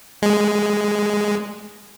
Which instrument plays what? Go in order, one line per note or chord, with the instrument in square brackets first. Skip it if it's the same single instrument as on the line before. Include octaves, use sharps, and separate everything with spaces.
[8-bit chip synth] G#3